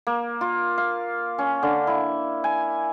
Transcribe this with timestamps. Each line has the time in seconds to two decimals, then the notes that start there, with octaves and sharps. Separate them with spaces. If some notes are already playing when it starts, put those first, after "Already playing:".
0.07 A#3
0.41 F4
0.78 F5
1.38 C#4
1.63 D3
1.87 E4
2.44 G#5